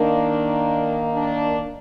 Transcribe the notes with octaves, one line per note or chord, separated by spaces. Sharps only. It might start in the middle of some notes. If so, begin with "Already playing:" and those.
Already playing: D#3 A#3 D4
D4